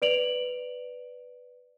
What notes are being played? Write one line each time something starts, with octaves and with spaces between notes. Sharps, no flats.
B4 D5 D7 F7 F#7